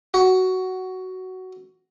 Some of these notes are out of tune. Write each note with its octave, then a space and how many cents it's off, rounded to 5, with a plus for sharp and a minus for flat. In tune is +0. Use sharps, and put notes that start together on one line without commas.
F#4 +10